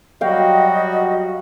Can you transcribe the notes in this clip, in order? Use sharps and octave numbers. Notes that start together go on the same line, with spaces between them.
F#3 G3 F#4 D#5 F5 G5